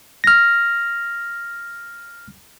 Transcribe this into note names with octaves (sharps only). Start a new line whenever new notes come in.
F6 A#6